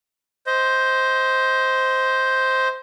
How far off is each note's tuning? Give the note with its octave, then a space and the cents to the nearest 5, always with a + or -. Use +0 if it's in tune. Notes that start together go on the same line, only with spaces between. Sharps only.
C5 +0 D#5 +25